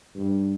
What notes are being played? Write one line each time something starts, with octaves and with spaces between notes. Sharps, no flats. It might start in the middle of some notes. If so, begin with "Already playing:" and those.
G2